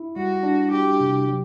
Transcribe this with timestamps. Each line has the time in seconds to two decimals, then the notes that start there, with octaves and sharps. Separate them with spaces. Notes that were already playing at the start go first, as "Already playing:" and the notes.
Already playing: E4
0.16 G3 F#4
0.43 D4
0.72 F#4 G4
1.00 C3
1.28 F#3